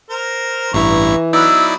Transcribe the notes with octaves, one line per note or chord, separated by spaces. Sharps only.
A#4 C5
A1 G2 E3 E4 A#5 C#6
F#3 B3 D#4 E4 D5 E6